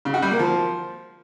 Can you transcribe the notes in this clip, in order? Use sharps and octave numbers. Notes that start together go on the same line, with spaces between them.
C#3
F#4
G3
A#3
F3